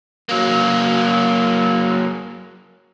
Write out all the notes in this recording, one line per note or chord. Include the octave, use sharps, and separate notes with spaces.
F#3 A#3